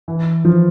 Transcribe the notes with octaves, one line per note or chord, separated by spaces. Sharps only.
E3
F3